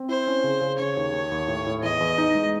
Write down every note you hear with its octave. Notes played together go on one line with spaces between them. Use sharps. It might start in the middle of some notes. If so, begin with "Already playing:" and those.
Already playing: C4
E4 C5
C#4
C#3
C#3
C#3 C#5
D#2
D#2
D#2
A2
A2
E2 D#5
E2
D#4
G#3